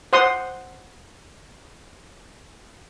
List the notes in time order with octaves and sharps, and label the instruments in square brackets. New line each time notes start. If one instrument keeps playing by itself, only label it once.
[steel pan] C5 F#5 C6 D#6